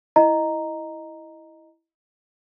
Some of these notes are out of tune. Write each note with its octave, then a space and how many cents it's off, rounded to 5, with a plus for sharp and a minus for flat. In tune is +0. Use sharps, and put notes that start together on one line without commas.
E4 +0 D#5 +0 A#5 +0